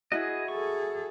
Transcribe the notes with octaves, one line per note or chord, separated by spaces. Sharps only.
E4 F#4 G#4 D#5
G#4 A4 C#6